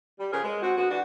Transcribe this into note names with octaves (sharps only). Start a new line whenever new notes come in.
G3
C#3 F3 G#4 A#4 B4
G#3
C4 F#4
D3 B3 F#4
E3 D4 F#4